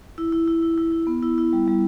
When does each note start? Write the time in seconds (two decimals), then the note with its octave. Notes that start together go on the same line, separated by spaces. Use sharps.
0.18 E4
0.32 E4
0.48 E4
0.62 E4
0.78 E4
0.92 E4
1.07 B3
1.23 E4
1.38 E4
1.53 G3
1.67 G3